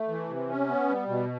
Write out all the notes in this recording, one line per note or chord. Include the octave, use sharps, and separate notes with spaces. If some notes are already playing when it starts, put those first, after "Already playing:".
Already playing: A3
E3
C3
C#4
B3
G3
B2